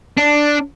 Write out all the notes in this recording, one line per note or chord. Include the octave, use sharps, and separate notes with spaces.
D4